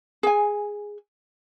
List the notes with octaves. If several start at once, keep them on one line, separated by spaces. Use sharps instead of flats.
G#4 G#5